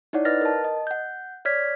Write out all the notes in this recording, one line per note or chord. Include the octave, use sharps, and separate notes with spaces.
D#4 E4 C#5 D5 F#5
B4 D#5 F#5 F6 A6 A#6
A#4 A5
D#5
F#5 G6
C#5 D5 F6 G#6 B6